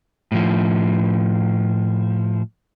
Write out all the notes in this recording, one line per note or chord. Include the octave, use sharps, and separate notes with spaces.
A2 F3